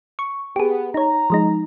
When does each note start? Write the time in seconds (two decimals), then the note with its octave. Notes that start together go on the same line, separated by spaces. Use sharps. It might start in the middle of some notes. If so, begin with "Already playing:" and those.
0.19 C#6
0.56 B3 G4 G#4
0.94 D#4 C#5 A#5
1.30 F3 G#3 D#4